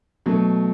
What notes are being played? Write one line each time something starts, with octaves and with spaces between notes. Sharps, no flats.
B2 F#3 A3